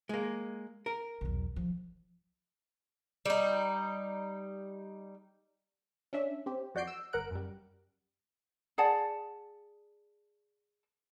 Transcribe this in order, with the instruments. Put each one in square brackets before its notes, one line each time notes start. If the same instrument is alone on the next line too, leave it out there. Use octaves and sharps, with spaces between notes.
[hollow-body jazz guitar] G#3 A#3
A#4
[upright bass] B1 E2
F3
[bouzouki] G3 D#4
[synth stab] C#4 D4 E5
C4 G4
F2 F#4 D5 G6 C7 D7
E6
G1 A#4 F#5 F#6 D7
F#2 G3
[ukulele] G#4 D5 F#5 A5